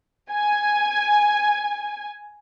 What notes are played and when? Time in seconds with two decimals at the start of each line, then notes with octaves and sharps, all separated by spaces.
0.31 G#5